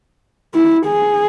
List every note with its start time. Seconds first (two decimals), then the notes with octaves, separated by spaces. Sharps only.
0.55 E4
0.87 G#4